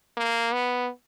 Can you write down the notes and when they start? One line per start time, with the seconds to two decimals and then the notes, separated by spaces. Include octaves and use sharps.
0.17 A#3
0.53 B3